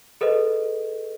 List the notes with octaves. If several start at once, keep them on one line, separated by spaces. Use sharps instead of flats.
G#4 A4 B4 C5 D#5